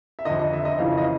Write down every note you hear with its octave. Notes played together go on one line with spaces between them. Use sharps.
E5
F2 D3 D#5
D#5
E5
D#5
F2 C#3 E3 F5
D#5